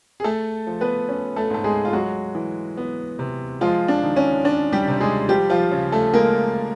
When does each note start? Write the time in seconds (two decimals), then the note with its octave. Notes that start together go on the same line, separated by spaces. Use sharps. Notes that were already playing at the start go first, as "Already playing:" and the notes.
0.20 G#4
0.24 A3 A4
0.67 F3
0.81 B3 B4
1.08 C#4
1.36 A3 A4
1.50 G#2 A4
1.64 G#3 G#4
1.85 F4
1.93 F#3 G#3 F#4
2.35 E3
2.77 B3
3.19 C3
3.61 F3 G#3 F4
3.88 D4
4.03 D#3
4.16 C#4
4.44 C#4 D4
4.73 G3 G4
4.88 C3
5.01 G#3 G#4
5.29 F3 G3 G4
5.50 F3 F4
5.71 C#3
5.92 A3 A4
6.13 G#3 A#3 A#4